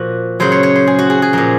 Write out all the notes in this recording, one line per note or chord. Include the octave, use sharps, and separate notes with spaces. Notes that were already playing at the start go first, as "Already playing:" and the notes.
Already playing: A#2 F3 F#4
C#3 F#3 C5
C#5
C#5
C5
G#4
F#4
G#4
G#4
A#2 F3 A#4